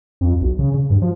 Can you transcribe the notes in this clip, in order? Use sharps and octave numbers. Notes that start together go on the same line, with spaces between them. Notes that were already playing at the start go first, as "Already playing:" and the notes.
F2
B1
C#3
C#3
G2
F3